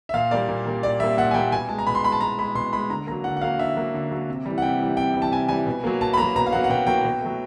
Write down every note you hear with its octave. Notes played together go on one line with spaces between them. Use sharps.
E5
A#2 F5
G3 A#3 D5
A#2
G3 A#3
A#2 D5
G3 A#3 E5
A#2 F#5
G#5
G3 A#3 G5
B2 G#5
G#3 A5
A#5
B2 B5
C6
G#3 B5
A5
B2 A#5
G#3 B5
B2 C6
G#3 B5
D3 A#5
F#3 A#3 A#5
D3 F#5
F#5
F#3 A#3 F5
D3 E5
F#3 A#3
D3
F#3 A#3
C3
E3 G3
F#5
C3 G5
E3 G3
C3 G5
E3 G3
A5
C3 G#5
E3 G3 G#5
B2
F#3 A#3
B2 A5
B5
F#3 A#3 A#5
B2 A#5
F5
F#3 A#3 F#5
F#5
B2 G5
F#3 A#3 G5
B2
F#3 A3